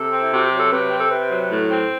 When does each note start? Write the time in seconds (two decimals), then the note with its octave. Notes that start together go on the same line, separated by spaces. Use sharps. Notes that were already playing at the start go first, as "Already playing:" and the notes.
Already playing: C3 A4
0.12 C4
0.20 E4
0.33 C3 F#4
0.46 G4
0.52 F#3
0.59 A4
0.71 C3 B4
0.88 C4 G4
0.99 A4
1.11 C3 B4
1.30 F#3
1.50 A2
1.70 C4